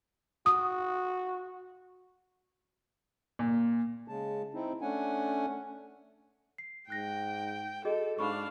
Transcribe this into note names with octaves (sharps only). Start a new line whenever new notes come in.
F#4 D#6
A#2
C#3 G#3 A5
C4 D#4 E4
A3 C#4 D4 F#5 G#5
C7
G#2 G5 F#6 A#6
F#4 G#4 A4 D#5
G#2 D4 F5 B5 C#6